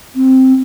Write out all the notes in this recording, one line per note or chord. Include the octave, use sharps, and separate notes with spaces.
C4